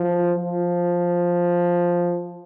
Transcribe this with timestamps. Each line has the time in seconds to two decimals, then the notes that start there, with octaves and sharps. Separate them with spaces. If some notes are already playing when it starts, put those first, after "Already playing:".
Already playing: F3
0.38 F3